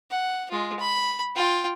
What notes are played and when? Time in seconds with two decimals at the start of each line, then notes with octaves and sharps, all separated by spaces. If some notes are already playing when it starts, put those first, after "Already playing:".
0.11 F#5
0.51 G#3 F4
0.79 B5
1.36 F4 G5